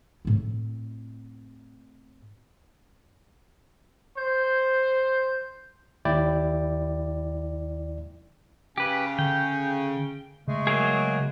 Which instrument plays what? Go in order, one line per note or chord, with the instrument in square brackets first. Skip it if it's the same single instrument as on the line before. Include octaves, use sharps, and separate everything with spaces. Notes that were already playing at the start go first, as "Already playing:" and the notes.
[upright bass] A2 C4
[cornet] C5 [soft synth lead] G6
[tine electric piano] D#2 E4 D5 G5
[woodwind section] C#3 C#4 [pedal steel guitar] G4 B4
[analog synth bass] D3 [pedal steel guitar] G5
[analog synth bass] C#3 [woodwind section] G#3 A3
[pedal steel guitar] F#3 A#3 G#4